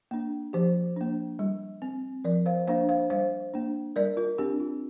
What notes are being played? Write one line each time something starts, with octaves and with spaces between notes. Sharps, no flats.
A#3 D4
F3 G4 C5
A#3 D4
G3
C4
F3 A#4 D5
C5 F5
A#3 D4 C5 F5
C5 F5
G3 C5 F5
A#3 D4
G3 A#4 D5
F4 A#4
C4 D4 G4
F4